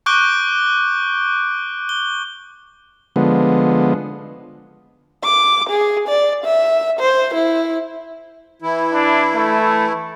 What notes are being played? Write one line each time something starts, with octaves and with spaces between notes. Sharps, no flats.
C#6 D6 F#6 G6 D7 G7
G7
D3 F3 G#3 B3
D6
G#4
D5
E5
C5
E4
E3 E4
D4
A3